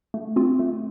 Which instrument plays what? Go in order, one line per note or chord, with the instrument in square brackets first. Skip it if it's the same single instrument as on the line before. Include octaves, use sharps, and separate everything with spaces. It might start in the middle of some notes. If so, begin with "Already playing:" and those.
[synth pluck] A3
C4 F4
A3